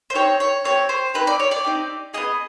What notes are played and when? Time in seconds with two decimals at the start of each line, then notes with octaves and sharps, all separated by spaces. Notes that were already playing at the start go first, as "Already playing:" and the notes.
0.10 C5
0.14 C4 D#4 G4 C#5
0.40 C#5
0.64 C4 D#4 G4 C#5
0.89 C5
1.14 C4 D#4 G4 B4
1.27 D5
1.40 C#5
1.51 D5
1.64 C4 D#4 G4
2.14 B3 D#4 G#4 D#5